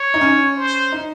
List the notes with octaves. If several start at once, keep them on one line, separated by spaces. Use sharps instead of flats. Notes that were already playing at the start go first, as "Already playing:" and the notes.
Already playing: C#5
D#4
C#4
C5
D#4